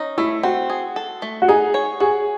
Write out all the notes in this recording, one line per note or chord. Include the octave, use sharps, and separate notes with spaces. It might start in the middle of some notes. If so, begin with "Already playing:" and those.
Already playing: C#4 D#4
A3 E4
C4 F#4
G#4
A4
A3
F#4
D#4 G#4
C#5
F#4 G#4